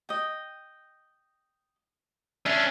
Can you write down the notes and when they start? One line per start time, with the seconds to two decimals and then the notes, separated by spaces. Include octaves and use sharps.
0.09 D#5 G5
2.46 C#4 D4 E5